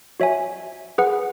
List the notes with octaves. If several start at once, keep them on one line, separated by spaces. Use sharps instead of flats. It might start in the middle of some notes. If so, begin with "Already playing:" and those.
F#4 C#5 E5 G#5
G#4 B4 F#5